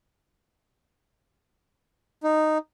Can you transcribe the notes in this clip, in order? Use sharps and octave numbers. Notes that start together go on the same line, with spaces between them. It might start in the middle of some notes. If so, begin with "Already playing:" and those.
D#4